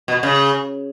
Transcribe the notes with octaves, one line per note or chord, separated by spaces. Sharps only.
B2
C#3